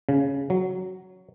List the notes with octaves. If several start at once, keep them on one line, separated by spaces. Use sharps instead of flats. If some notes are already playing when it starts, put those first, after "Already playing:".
C#3
F#3